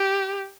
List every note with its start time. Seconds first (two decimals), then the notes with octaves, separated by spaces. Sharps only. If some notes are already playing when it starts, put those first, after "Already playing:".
Already playing: G4